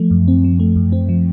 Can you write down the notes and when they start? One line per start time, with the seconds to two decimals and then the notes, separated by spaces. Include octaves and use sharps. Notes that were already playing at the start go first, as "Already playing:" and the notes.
Already playing: F3 A3
0.11 F#2
0.28 C4
0.44 F3
0.60 A3
0.76 F#2
0.92 C4
1.09 F3